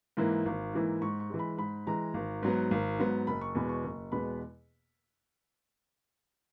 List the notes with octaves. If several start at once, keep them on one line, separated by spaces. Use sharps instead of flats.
G#2 E3 A#3 E4
G#1
G#2 E3 A#3 E4
G#2 C#6
C#6
E3 G#3
B5
G#2 B5
E3 G#3 A#5
G#1
G#2 F#3 B3
G#1
G#2 F#3 B3
F#1 B5
C#6
E2 B2 G#3 B3 B5
C#6
F#1 C#6
E2 B2 G#3 B3 B5